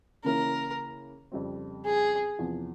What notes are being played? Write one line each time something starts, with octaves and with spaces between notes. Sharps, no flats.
C#3 E3 A#3 C#4 E4 A#4
F2 C#3 G3 C4
G#4
E2 C3 F3